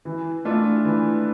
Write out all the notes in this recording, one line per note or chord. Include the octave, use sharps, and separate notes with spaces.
E3
A3 D4 F4
E3